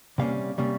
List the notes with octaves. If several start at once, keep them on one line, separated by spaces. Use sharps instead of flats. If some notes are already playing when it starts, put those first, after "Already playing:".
C3 G3 A#3 C#4 F5
C3 G3 A#3 C#4